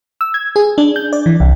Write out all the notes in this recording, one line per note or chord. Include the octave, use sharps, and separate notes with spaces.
E6
G#6
G#4
D4
G6
D5
E3
C2